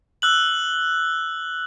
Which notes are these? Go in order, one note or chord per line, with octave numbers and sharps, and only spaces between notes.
E6 F#6 F#7